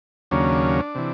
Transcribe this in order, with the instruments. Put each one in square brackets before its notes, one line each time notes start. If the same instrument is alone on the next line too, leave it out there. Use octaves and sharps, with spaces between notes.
[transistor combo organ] D#2 C#3 F#3 A#3 C#4 D4
C3 E3